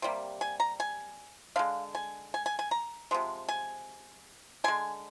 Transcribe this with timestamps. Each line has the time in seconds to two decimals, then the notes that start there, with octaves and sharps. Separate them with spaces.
0.02 C3 G3 A#3
0.41 G#5
0.60 A#5
0.80 G#5
1.56 D3 G#3 F5
1.95 G#5
2.34 G#5
2.46 G#5
2.59 G#5
2.71 A#5
3.11 C3 F3 G#3
3.49 G#5
4.64 D3 G#3 G#5